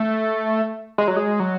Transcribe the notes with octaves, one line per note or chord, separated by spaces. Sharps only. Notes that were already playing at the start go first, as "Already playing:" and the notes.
Already playing: A3
G#3
F#3
G#3
F#3